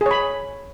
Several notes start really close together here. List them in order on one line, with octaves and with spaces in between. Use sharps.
G#4 C#5 B5